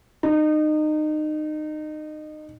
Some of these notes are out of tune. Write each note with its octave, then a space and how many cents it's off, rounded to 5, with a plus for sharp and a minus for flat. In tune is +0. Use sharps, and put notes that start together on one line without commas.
D#4 -25